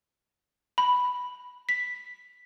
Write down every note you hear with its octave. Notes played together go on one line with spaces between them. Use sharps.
B5
B6